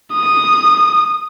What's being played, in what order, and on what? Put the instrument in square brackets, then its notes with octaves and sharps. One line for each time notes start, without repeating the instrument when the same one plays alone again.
[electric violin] D#6